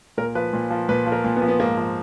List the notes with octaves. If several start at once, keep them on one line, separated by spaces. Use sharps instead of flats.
A#2 A#4
F3 B4
A#2
F3
A#2 B4
F3
A#4
A#2
B3
F3
B3
G#2 A#3
F3